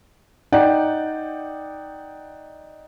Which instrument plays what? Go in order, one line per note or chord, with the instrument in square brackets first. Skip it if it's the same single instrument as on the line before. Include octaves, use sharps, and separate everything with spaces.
[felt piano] D#4 D5 F#5 G5